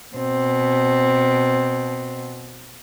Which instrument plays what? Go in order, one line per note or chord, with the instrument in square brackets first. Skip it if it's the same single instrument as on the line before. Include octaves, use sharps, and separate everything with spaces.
[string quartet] B2 C4